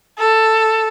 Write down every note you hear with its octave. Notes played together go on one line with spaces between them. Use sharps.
A4